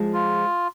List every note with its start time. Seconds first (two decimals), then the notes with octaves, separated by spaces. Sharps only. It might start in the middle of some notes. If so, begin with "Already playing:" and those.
Already playing: F3 G#3
0.13 F4